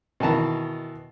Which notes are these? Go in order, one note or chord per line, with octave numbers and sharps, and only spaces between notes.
B2 D#3 E3 A5 A#5